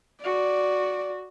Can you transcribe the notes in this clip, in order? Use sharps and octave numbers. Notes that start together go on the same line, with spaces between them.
F#4 D5